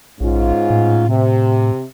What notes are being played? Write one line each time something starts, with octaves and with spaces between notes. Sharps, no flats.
A#1 G#2 C#4 F4
A2
C3